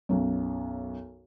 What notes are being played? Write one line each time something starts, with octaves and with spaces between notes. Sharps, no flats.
B1 F#2